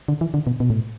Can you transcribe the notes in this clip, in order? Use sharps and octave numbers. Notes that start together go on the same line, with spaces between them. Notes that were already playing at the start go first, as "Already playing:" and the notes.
D3
E3
D3
B2
B2
A2